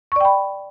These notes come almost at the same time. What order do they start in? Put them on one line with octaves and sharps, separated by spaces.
C#6 D5 G5 B5